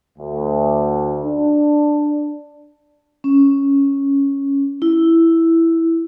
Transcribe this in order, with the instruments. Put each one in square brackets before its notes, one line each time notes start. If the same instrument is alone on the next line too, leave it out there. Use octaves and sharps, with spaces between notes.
[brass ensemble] D2
D4
[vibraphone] C#4
E4